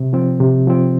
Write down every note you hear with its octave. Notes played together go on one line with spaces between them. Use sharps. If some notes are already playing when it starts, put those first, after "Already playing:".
Already playing: C3
F3 C4
C3
F3 C4